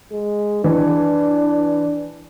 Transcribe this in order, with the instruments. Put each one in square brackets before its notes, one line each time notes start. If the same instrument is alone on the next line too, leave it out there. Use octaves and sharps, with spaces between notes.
[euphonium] G#3
[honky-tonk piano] E3 [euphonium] D4